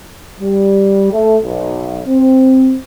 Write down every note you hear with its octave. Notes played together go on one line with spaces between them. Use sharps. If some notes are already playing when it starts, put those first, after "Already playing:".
G3
A3
B1
C4